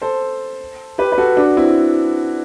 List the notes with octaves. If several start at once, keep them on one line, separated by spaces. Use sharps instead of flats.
A4 C5
G4 B4
B4
F#4 A4
D4 F#4
C4 E4